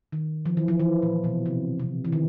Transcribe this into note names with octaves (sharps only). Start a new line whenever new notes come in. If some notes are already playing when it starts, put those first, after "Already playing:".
D#3
F3
E3
F3
E3
A#2
B2
C3
C3
E3
D#3